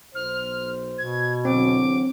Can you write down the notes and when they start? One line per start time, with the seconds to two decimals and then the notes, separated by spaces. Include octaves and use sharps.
0.15 B1 C5 F6
0.98 B2 G#6
1.45 E2 D3 F#3 C4 D6